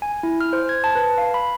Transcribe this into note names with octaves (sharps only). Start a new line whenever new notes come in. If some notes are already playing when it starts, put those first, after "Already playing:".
G#5
E4
F6
C5
G#6
A5
B4
F5
B5